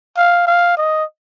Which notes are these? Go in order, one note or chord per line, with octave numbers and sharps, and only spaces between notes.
F5
F5
D#5